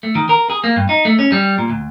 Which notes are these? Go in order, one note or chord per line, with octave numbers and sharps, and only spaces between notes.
A3
D#3
A#4
G#4
A#3
G2
D#4
A3
C#4
G3
A#2
D2